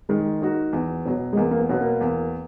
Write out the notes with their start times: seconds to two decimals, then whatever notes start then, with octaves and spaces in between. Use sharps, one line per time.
0.09 D#3 G#3
0.41 A#3 D#4 F#4
0.73 E2
1.06 B2 F#3 B3
1.33 G#3
1.37 E2 A#3
1.51 A#3
1.59 B3
1.69 B2 F#3 B3
1.81 A#3
2.01 E2